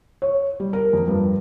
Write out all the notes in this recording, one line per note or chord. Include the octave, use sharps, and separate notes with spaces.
C#5
G3
A#4
F2
G2